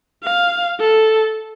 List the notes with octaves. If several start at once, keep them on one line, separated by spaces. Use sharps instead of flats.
F5
A4